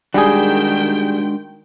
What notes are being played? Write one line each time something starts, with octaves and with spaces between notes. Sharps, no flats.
D#3 G3 G#3 D4 F#4 G#4 G5